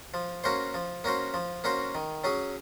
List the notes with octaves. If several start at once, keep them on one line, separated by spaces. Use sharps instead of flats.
F3
A#3 C#4 F#4 C5
F3
A#3 C#4 F#4 C5
F3
A#3 C#4 F#4 C5
D#3
F#3 C#4 G#4